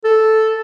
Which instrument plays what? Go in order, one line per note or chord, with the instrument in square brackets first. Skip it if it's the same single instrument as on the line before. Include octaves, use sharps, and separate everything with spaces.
[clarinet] A4